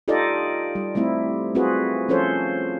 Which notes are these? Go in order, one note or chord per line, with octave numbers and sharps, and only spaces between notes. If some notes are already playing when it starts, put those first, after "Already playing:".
D#4 F4 G4 A4 D5 D#5
G3
G3 A3 C4 E4
C4 F4 F#4 G#4 B4
F3 C#4 F4 A4 C5 C#5